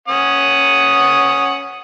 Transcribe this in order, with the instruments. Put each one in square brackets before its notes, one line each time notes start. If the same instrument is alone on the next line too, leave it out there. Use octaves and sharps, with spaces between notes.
[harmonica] C#4 F#5 D#6